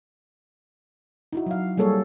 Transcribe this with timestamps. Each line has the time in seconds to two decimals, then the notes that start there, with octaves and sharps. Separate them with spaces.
1.33 D#4 E4 F#4
1.46 F#3 F5
1.77 G3 A#3 G#4 A4 C#5